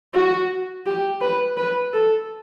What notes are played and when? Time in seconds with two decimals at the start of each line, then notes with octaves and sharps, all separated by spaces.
0.14 F#4
0.86 G4
1.21 B4
1.57 B4
1.93 A4